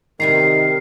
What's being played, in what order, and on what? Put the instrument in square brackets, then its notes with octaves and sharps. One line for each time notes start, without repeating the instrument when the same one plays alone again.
[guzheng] C3 G3 A#5 [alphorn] D#3 [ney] A#4 [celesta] C7